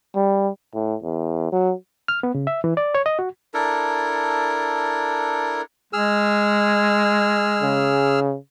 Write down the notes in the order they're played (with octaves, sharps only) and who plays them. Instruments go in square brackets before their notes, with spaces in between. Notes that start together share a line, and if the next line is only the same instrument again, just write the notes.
[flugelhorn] G3
[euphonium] A2
E2
F#3
[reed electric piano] F6
B3
C#3
E5
E3
D5
C#5
D#5
F#4
[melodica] D4 E4 A4 A#4
[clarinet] G#3 [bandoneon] G#4 E6 F6
[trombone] C#3